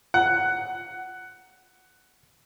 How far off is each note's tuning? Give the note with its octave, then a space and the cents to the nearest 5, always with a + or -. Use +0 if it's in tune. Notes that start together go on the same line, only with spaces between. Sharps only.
F#5 +10